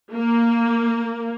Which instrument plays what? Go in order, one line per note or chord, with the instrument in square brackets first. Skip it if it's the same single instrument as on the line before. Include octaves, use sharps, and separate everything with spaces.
[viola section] A#3